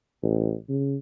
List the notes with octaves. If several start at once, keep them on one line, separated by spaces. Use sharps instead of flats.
A1
C#3